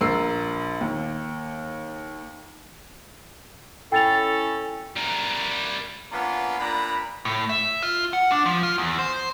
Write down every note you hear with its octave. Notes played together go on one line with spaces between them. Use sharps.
A#1 A#4 E6 C7
D#2
C#4 E4 A4 G5 A6 F7
G3 A#4
A#3 B3 C#4 D4 F4
A#2 D4 A#5 B5
A2
E5
F4
F#5
D4
F3
F4
E2
C5